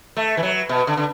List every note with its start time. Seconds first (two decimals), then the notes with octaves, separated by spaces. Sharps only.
0.17 A3
0.37 E3
0.43 F#3
0.69 B2
0.87 D3
0.97 D3